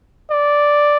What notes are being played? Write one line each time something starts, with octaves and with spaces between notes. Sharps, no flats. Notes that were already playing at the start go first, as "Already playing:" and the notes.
D5